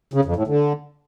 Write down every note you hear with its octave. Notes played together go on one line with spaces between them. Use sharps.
C#3
F2
A2
D3